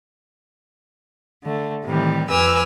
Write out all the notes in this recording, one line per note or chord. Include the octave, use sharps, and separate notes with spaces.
D3 A3
A2 C3 D#3 E3 G3
F2 B4 G#5 D6 E6 F6